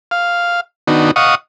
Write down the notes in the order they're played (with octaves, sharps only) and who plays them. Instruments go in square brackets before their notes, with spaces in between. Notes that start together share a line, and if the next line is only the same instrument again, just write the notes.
[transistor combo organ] F5
D#3 B3 D4 D#4 F#4
D#5 F5 F#5 C#6 D#6